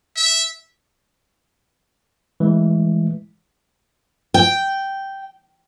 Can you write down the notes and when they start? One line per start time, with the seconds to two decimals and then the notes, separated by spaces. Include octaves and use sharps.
0.17 E5
2.40 E3 G#3 A3
4.34 G5